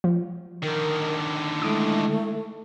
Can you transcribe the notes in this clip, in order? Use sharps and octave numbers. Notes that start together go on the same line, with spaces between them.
F3
D3 D#3 A#4
G#3 A3 E4 D#6 D7